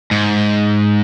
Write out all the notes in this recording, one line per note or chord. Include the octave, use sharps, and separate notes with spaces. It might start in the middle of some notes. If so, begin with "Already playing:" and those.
G#2